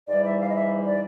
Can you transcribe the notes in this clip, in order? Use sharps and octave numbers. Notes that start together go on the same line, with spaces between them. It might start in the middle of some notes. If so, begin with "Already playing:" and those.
G#2 E3 G3 D5
E5
F5
D#5
E5
D5